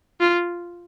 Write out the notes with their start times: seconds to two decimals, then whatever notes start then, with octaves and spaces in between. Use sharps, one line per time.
0.21 F4